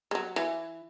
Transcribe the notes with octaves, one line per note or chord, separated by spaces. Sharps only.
G#3
F#3
E3